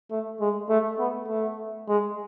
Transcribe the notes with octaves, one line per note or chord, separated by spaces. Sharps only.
A3
G#3
A3
B3
A3
G#3